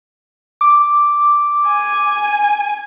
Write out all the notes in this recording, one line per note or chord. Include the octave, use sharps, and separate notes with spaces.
D6
G#5